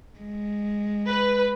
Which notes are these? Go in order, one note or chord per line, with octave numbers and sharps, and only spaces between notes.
G#3
B4